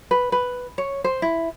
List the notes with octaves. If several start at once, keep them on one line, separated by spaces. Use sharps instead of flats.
B4
B4
C#5
C5
E4